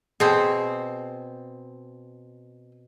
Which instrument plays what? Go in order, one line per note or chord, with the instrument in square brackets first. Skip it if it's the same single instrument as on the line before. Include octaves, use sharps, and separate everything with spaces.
[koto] B2 C4 [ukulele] G#4